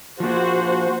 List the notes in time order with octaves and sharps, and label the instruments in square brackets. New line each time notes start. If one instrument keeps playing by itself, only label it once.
[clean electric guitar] F3 A#3 [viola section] F#4 C5